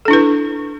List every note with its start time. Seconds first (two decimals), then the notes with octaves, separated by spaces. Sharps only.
0.05 A4
0.08 D4
0.11 E4
0.13 B4